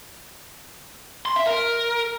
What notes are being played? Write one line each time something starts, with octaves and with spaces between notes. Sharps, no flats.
C6
E5
A#4